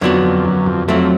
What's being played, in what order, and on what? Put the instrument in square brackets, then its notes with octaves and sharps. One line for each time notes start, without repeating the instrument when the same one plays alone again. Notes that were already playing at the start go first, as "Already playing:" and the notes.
[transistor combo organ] F2 [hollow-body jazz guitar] D3 F#3 B3 D4 F#4
[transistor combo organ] F2
F#2
F2
[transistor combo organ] F2 [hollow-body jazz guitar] F#3 A3 C4